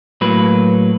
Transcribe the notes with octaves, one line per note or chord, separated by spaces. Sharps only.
A2 F#3 A#3 B4